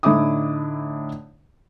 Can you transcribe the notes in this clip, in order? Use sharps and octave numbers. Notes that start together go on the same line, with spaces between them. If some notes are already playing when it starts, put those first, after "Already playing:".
A2 D3 D#4 E4 D6 D#6